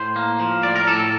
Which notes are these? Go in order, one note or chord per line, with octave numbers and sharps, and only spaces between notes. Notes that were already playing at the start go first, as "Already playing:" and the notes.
Already playing: A2 C5
A#3
F3
A2 D5
A#4
A2 A4
A4